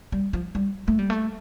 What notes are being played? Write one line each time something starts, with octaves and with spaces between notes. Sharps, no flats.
G3
F3
G3
A3
G3
A3